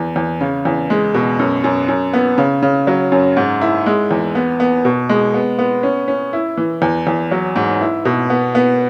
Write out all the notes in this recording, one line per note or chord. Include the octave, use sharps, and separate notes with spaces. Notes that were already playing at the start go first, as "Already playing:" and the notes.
Already playing: E2
E2
C#3
E2
G#3
B2
F#2
F#2
F#2
B3
C#3
C#3
F#3
F#2
G#2
E4
G#3
E2
B3
B3
B2
G#3
B3
B3
C#4
C#4
E4
E3
E2
E2
F#3
G#2
E4
B2
B3
B3